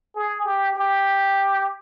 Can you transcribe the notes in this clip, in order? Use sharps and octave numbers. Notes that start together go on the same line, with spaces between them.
G#4
G4
G4